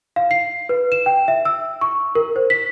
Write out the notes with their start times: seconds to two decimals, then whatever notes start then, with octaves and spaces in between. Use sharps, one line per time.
0.16 F5
0.31 C7
0.69 B4
0.92 E7
1.06 G5
1.28 E5
1.45 E6
1.81 C#6
2.15 A#4
2.36 C5
2.50 B6